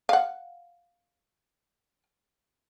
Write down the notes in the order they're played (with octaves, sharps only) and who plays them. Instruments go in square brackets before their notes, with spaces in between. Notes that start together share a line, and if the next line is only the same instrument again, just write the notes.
[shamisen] F5 F#5